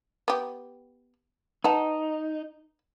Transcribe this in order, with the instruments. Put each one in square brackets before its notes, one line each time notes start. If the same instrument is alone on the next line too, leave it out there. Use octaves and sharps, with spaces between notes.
[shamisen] B3 G4
[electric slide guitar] D#4 [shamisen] B4 F#5 A5